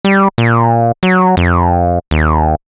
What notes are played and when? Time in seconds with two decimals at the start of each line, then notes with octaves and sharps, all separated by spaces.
0.05 G3
0.38 A#2
1.03 F#3
1.37 F2
2.11 D#2